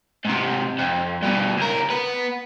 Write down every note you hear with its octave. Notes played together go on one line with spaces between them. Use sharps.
G#2 C3
F2
G2 B2
C#2 A#4
B3 B4